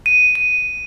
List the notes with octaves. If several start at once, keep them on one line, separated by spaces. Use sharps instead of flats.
D#7
D#7